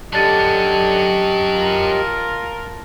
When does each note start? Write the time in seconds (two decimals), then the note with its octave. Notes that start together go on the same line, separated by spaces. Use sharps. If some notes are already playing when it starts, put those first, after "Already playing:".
0.13 D3 F#3 C#4 G4 D#5 A5 A6
1.55 F4 A#4